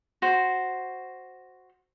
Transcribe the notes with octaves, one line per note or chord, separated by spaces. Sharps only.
F#4 C5